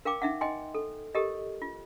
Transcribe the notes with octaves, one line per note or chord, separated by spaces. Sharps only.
A#4 F5 G5 D6
D#4 E5 F#5
D#5 G5 G#5 C6
A4
G4 A4 A#4 D#5
F4